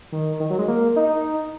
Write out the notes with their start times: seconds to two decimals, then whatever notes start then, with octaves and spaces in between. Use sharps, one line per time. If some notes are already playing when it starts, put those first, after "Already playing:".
0.12 D#3
0.40 D#3
0.50 F#3
0.58 G#3
0.68 A#3
0.96 D#4